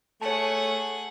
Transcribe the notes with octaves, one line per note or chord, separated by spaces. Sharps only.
A3 G#4 C#5 F#5 A5